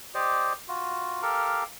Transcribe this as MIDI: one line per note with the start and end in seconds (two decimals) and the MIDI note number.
0.15 0.53 67
0.15 0.53 72
0.15 0.53 74
0.15 0.53 75
0.68 1.21 65
0.68 1.21 66
1.22 1.64 67
1.22 1.64 69
1.22 1.64 70
1.22 1.64 77